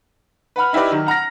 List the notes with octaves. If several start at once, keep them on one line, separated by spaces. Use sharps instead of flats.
B4 F#5 B5 F6
D#4 E4 G4 B4 D5
D#3 F#3
F#5 A#5 F6 A#6